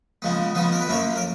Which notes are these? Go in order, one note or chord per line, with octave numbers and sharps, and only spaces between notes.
C#3 F3 G#3 B3
C#3 F3 G#3 B3 B4
A#4
B4
F#2 F3 A#3 C#4 A#4
A#4